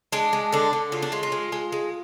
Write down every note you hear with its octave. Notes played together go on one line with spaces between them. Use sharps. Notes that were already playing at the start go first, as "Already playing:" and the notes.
G#3 D4
G#3
D3 D4
D3
C#3 F4
D4
G#3 F4
F4
G#3
G#3
G#3